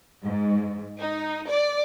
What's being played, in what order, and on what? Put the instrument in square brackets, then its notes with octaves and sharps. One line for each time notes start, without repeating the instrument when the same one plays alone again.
[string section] G#2
D#4
D5